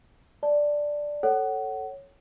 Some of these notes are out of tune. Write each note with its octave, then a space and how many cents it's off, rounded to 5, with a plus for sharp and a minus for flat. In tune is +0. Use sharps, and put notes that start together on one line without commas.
D5 +0 A5 +0
A4 +5 C#5 +0 F#5 +25